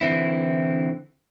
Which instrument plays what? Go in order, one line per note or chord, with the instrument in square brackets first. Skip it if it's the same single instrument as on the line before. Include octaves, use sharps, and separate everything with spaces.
[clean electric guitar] D3 E3 C4 E4